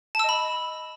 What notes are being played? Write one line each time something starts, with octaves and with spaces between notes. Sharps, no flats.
D#5 A5 B5 E6